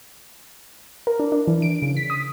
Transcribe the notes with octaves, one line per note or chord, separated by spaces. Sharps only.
A#4
D4
D4
E3
D7
C#3
B6
D#6